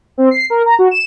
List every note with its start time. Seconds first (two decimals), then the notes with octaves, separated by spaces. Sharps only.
0.18 C4
0.31 C7
0.50 A#4
0.66 A#5
0.79 F#4
0.91 E7